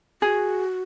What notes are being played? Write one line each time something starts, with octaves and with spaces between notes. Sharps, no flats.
F#4 G#4